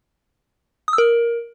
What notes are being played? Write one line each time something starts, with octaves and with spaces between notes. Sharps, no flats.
D#6
E6
A#4